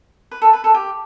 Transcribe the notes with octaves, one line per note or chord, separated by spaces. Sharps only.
B4
A4
B4
A4
G4